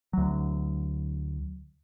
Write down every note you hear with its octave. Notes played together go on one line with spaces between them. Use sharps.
D2 F#3